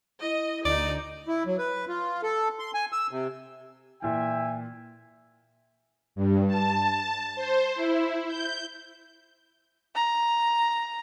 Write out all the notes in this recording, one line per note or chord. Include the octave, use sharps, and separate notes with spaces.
E4 D#5
D2 D#4 D5
E4
F#3
B4
F4
A4
C6
G#5
E6
C3
A#2 E3 E5 G5 G#5
G2
A5
C5
E4
G6
A#5